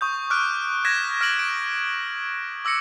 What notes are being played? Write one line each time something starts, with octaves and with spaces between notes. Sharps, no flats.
C#6 D#6 G6
D6 F6 F#6 D7
F#6 G#6 A#6 B6 E7
F6 A#6 D7 F#7
D7
D6 E6 A#6 C#7